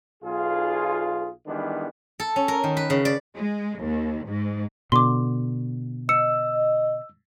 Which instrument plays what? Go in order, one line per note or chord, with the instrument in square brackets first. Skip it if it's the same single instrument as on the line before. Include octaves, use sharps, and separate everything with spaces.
[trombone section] B1 F4 G#4
D#3 E3 G3 G#3 B3 D4
[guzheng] A4
C#4
A#4
D#3
B4
C#3
D5
[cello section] G#3
D#2
G#2
[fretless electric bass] B2 D3 [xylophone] C6 D6
[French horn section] D#5 [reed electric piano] E6 [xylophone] C#7